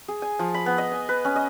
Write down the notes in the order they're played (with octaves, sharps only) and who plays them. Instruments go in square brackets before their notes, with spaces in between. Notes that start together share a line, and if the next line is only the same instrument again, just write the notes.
[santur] G#4
G#5
F3
B5
B3
D#5
G#5
B4
C#4
D#5